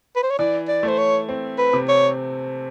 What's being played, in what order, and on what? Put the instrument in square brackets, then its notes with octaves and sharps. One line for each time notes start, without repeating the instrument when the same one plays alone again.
[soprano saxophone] B4
C5
C#5
[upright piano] E3 [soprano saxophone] D5
[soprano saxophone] D5
[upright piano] A3
[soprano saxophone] C5
C#5
[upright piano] C4
[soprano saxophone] B4
[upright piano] C3
[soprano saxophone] C#5